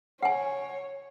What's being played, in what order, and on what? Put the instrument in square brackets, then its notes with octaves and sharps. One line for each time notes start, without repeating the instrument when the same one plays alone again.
[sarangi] C#5 [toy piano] F#5 G#5